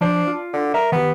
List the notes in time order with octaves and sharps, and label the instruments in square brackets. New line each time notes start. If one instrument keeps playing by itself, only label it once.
[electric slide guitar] F3 C5 [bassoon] D4
[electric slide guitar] F4
[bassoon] D3
[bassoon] A#4 [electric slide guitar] E5
[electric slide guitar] D#3 G4 [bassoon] B3